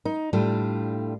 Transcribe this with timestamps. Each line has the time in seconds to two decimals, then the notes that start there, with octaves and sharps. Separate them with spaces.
0.05 D#4
0.33 A2 G3 D4 F4